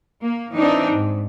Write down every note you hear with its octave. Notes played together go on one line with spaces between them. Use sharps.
A#3
E3 C4 D4 D#4
G#2